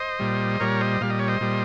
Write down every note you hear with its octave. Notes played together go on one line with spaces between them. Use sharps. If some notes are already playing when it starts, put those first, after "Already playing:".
Already playing: C5 D#5
A#2 G3
A#2 G3 A#4 C#5
C5 D#5
A#2 G3 F5
D#5
C#5
C5 D#5
A#2 G3